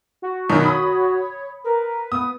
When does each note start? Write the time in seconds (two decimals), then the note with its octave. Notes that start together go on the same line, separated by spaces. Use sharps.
0.22 F#4
0.50 F#2 B2 D#3 C#5
0.64 B5 D#6
1.64 A#4 B4
2.12 B3 D#6